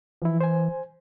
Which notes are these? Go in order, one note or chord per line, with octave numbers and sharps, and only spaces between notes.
E3 F3 E4
C5 G#5